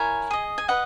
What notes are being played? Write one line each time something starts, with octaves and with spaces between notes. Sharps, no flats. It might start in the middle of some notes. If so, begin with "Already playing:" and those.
Already playing: E4 A#4 C#5 G#5
G#4 D#5
G#5
B4 D#5 F#5